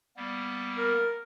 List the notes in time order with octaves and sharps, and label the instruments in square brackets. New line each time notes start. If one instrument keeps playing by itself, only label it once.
[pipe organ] G3 A#3 B3
[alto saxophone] A#4